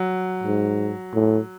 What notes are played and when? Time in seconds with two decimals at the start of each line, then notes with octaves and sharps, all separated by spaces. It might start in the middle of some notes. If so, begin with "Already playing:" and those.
Already playing: F#3
0.44 G#2
1.14 A2